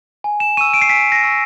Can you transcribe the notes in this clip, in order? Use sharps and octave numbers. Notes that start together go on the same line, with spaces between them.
G#5
E7
C#6 E6 D#7
D7
C7
G#5 B6
A#6
C#6 E6